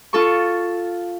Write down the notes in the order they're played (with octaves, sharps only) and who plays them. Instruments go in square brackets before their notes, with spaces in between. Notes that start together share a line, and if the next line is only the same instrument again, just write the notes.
[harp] F4 A4 C#6